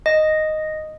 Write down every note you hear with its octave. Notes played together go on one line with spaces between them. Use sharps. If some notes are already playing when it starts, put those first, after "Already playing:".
D#5